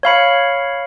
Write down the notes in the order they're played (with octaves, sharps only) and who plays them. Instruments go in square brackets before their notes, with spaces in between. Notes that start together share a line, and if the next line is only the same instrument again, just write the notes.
[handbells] C#5 F5 B5 C#7